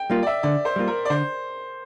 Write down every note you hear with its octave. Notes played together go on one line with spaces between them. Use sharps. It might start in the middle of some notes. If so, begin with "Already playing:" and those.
Already playing: G5
G3 A#3 F4
D5
E5
D3 D5
C5
G3 A#3 F4
A#4
D5
D3 C5